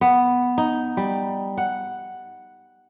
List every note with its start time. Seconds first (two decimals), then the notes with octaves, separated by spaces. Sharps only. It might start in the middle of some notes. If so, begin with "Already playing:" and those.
0.01 B3
0.58 D#4
0.97 G3
1.57 F#5